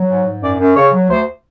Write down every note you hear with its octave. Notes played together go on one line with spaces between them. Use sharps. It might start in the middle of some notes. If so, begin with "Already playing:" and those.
Already playing: F#3
G#2
G#2
F#2 D5
F#2
C#3 C#5
F#3
D2 C5